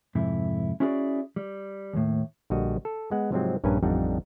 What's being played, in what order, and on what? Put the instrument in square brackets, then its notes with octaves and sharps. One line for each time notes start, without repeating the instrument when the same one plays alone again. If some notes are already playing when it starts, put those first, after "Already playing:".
[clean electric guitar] F2 G#2 C3 E4
C#4 E4 F#4 G#4 A#4 D5
G3
D#2 A2
[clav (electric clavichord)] A#1 D3 G3 F#4 D#5 F#5
A4
G#3 B3 F#5
G#2 C3 F3 F#3 G#3 C4
A#1 G2 C#4 A#4 B4 G#5
A1 F2 G3 D4 D#4 F#5